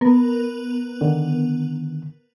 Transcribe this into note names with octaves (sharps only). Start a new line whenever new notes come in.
B3 A#4
D3 D#3